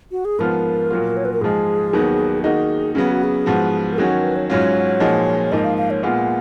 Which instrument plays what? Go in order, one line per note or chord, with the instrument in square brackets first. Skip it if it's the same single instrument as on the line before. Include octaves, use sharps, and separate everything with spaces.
[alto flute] F#4
G#4
[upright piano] G#2 F3 B3 F4 [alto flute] A#4
[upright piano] A#2 F#3 A#3 F4
[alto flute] C#5
B4
A#4
[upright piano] G#2 F3 G#3 [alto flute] G#4
[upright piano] D#2 D#3 F#3 B3
[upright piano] D#3 A#3 D#4 F#4 [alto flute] G#4
[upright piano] C#3 F#3 B3 [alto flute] G#4
[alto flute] F#4
G#4
[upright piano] G#2 F3 B3 F#4
[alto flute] A#4
[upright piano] D#3 F#3 C#4 F#4 [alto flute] G#4
[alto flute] A#4
B4
C#5
[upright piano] G#2 F#3 C#4 F4 [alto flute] C#5
[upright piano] A#2 F3 G#3 D#4 F#4
[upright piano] G#2 F3 A#3 D#4 [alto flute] D#5
[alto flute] F5
F5
C#5
[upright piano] A#2 G#3 B3 F4 [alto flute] F#5